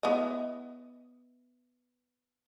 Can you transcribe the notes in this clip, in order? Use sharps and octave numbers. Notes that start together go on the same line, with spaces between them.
B3 E4 D#5